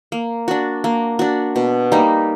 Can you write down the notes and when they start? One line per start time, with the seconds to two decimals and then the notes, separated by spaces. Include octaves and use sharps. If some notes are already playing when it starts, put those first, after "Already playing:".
0.12 A#3
0.48 D4 F#4
0.84 A#3
1.19 D4 F#4
1.56 B2
1.92 G3 A#3 D#4